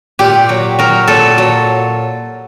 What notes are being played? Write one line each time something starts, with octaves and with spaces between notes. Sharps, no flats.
A#2 G4
F#3
F#3 A#4
A#2 A4
F#3